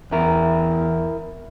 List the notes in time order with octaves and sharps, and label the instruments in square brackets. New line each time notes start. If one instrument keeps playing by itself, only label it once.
[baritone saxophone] E2 [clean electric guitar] E4 A#4